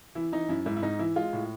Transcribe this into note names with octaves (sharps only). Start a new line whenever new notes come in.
E3 E4
E3 D#4
F#2 E4
G#2 E4
E4
G#2 D#4
E3 E4
G#3 F4
A2